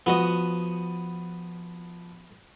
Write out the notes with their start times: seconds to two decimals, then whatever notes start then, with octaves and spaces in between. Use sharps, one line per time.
0.06 F3 B3 F#4 D#5